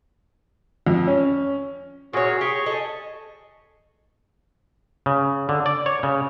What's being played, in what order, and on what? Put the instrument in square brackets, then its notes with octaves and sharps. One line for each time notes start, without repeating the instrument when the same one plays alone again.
[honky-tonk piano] F2
C#4
[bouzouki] A#2 C#5 [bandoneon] F#4 G#4
[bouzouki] G4 [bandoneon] G#4 C#6
[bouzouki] A4 D#5
[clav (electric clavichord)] C#3
D3
D5
C#5
C#3